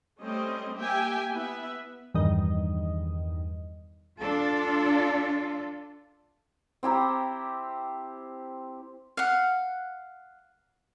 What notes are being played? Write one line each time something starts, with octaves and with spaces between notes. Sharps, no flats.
G3 A3 C4 C#4 C5 D#5
A#3 G4 E5 G5 G#5
B3 E4 B4 E5
E2 G2 D#3 D#5
D4 F4 A4
C4 E4 G4 A#5
F5 F#5